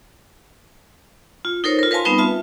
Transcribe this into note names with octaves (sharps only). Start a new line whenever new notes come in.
F4
D#4 A4 A#4 C5 C#5
F4 A#4
A#4 B4 F5 G#5 A5 C6
G3 B3 C4 D#4 B4 D#6
F4 E5 A5